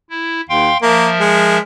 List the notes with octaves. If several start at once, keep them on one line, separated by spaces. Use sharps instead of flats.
E4
D#2 F5 G5 C6
F3 A#3 A#4 E5
G#3